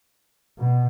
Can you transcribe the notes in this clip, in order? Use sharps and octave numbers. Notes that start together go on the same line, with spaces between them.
B2